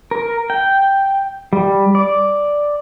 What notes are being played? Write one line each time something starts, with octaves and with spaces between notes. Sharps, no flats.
A#4
G5
G3
D5